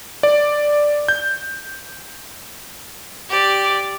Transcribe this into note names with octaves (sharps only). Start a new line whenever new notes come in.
D5
G6
G4 D5